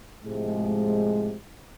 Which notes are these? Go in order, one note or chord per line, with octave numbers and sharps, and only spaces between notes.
A2 C3 F3 G#3